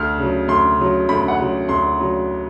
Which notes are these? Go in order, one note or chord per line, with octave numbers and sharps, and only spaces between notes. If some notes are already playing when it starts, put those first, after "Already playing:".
Already playing: D2 F6
C#3 F#3
D2 C6
C#3 F#3
D2 B5
F#5
C#3 F#3
D2 C6
C#3 F#3